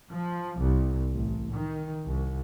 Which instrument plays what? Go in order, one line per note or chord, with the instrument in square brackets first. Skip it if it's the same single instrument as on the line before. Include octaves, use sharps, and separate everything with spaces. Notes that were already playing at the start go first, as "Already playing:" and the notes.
[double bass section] F3
C2
A1
D#3
C2